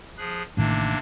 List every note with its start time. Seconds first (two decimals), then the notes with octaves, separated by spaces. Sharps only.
0.17 F3 G#4 F#6
0.57 A1 A2 C3 D#3 A#3 D4